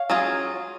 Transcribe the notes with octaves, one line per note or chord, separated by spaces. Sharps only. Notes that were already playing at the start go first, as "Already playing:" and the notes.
Already playing: C#5 F5
F#3 C#4 F4 G#4